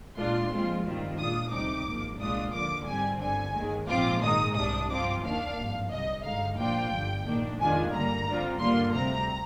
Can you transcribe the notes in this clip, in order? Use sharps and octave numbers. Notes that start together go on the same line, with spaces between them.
A#2 G#3 D4 F4 C6
A#2 F3 G#3 C4 F4
G2 D#3 G3 C4 F4
A#2 G#3 D4 F4 D#6
D2 C3 G3 C4 D#4 D6
G#1 G#2 F3 A#3
C2 A#2 G#3 D4 F4 D#6
D#2 D3 F3 A#3 D6
G#2 G3 C4 G#5
G1 G2 D3 G#5
D#2 D#3 G#3
A#1 G#2 F3 C4 F4 D6
G#2 D#3 G#3 D#4 D#6
C2 C3 G3 D4 D#6
G2 F3 C4 F4 D6
D#2 D#3 A#3 D4 F5
G#1 G2 F3
C2 C3 G3 D#5
G2 D3 G#3 D#4 F5
A#2 F3 A#3 D4 F4 G5
G1 G2 D3
A#1 G#2 D#3 A#3 D4
F2 D#3 G#3 D4 F4 G#5
G2 D3 G3 A#3 A#5
G2 D3 G3 C4 F4
G2 D3 G3 A#3 F4 C6
D2 C3 G3 C4 A#5